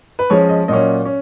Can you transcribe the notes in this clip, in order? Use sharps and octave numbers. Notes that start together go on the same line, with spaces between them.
B4
F3 G#3 C#4 C#5
D#5
A#2 F#3 C#4 D#5
C#4